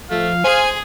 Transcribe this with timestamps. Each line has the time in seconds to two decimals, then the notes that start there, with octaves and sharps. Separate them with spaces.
0.11 F3 A3 F5
0.44 G#4 C5 G#5